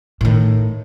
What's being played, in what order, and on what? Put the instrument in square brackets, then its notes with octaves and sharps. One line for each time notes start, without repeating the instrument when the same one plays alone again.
[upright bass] A2 D#3